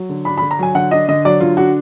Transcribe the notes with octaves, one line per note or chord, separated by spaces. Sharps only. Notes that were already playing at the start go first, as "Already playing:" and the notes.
Already playing: F#3
D3
D4 B5
B5
D3
A#5
F#3 G#5
D3 F#5
D4 D#5
D3 D#5
F#3 D5
D3 F4
D4 F#4